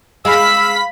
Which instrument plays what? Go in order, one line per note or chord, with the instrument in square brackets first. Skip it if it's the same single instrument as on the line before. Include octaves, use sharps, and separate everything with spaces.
[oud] G#3 [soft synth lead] F5 [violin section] B5 B6 [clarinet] E6